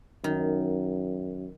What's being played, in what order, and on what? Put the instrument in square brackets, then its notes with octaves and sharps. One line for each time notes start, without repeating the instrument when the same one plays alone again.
[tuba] F#2 [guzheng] D#3